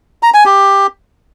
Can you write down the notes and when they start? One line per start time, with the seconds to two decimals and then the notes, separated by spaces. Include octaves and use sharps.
0.23 A#5
0.34 G#5
0.46 G4